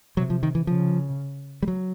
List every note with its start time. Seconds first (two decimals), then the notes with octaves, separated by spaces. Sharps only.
0.17 C3 F#3
0.30 F3
0.43 D#3
0.55 E3
0.67 C#3 F3
1.62 G3
1.68 F#3